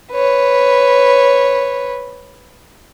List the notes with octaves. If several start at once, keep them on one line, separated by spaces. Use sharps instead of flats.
B4 C#5